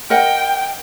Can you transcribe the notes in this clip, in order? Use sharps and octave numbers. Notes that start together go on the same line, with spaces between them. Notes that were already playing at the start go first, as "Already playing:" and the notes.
A#4 D#5 F#5 G5